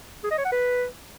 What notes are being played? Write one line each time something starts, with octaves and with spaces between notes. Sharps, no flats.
G#4
D#5
C#5
F#5
B4